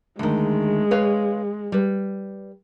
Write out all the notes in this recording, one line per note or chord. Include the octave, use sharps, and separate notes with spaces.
D2 D#3 G#3
B4 C#5 F5
G3 B4